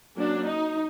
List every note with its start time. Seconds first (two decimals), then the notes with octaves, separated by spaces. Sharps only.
0.17 F#3 A#3 C#4 D4
0.46 D#4